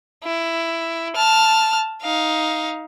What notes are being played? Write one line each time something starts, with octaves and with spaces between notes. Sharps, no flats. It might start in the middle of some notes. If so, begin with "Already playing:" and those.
E4
A5 F6
D#4 F5